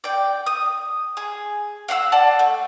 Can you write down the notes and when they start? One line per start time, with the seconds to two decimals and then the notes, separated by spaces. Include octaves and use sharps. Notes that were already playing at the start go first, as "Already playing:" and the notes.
0.04 D5 G5
0.46 D#6
1.17 G#4
1.88 F5 F#5 C6 E6
2.12 D5 F#5 A5
2.39 A3